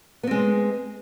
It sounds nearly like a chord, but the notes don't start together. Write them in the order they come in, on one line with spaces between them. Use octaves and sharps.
B3 C4 G#3